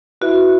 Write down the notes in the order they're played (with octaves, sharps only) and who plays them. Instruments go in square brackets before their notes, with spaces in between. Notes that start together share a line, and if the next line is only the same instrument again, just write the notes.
[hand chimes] E4 B4 E5 [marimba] F#4